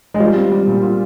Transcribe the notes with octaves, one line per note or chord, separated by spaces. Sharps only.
G#3
G3 F4
C4
G3
A#2
F4